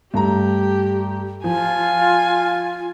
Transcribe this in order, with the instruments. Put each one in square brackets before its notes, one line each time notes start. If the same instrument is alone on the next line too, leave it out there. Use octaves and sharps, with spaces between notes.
[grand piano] G2 A3 A#5 [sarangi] G4
[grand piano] F3 [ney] F4 [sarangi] G#5